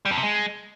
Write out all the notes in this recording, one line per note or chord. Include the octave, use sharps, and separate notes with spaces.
G3
F2
C3
G#3